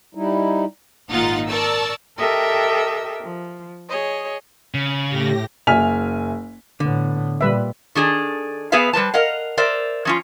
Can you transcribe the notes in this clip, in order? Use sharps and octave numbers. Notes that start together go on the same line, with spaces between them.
G3 D#4 E4
G#1 A#2 D#4 F4 F#5 A6
A#4 D5 A5 C#6 E6
G4 A4 A#4 D#5 E5 G5
F3
G#4 C#5 D#5
C#3
A2 G4 A#6
F#1 E5 G#5 F6 B6 F7
A2 D3 B3
A#2 G3 B4 E5
D#3 D4 G#4 A4
B3 G#4 B4 E5 F5
G3 B4 C5 A5
A#4 D#5 F5 F#5
A#4 C5 D5 E5
F3 C#4 F4